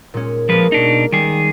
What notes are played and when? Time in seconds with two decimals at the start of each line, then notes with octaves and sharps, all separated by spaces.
0.14 A#2 G#3 C#4
0.49 F3 G#3 A#3 B4
0.72 B2 D4 D#4
1.12 D#3 G3 G#4